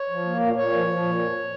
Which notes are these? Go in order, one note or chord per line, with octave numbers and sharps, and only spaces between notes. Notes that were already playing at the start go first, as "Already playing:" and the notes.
Already playing: C#5
F3
A#3
A#2
A#2 C#5
F3
F3
A#2
F2